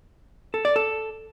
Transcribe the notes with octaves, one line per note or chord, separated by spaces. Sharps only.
A4
D5
A4